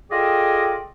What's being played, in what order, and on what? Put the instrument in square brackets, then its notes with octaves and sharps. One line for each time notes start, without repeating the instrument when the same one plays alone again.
[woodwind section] F4 G#4 A4 D5 D#5 G5